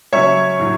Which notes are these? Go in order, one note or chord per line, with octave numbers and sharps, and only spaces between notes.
C#3 F#3 C#4 C#5 E5
A2 F#3